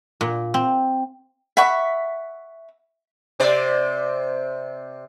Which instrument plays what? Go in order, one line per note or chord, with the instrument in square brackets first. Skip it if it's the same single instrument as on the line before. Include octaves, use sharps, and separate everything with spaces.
[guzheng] A#2
C4
[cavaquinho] E5 F#5 B5 C#6
[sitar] C3 C5 D5